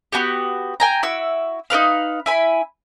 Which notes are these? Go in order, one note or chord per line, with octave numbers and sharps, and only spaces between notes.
B3 F#4 G4
G5 G#5 A#5
E4 F#4 E6
D#4 A#4 B4 F5
E4 G#5 B5